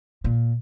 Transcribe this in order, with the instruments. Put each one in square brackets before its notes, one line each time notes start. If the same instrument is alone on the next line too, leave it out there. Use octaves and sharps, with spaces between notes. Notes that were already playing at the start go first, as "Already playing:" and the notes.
[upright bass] A#2